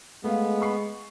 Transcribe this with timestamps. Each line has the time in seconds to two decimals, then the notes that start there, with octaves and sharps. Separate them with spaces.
0.24 G#3 A3 B3 F5
0.61 B5 C#6 C7